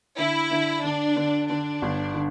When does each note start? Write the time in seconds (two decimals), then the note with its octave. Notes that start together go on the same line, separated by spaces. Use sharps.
0.18 D3 E4
0.51 D3
0.84 D3 D4
1.16 D3
1.49 D3 D4
1.82 G1
2.14 D3